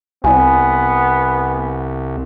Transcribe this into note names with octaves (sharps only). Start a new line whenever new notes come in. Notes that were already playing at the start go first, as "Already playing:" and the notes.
C2 B3 G#5